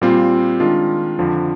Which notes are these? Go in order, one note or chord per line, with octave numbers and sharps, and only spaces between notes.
A#2 G3 C4 F4
D#3 G#3 D4 F4
F2 D3 F3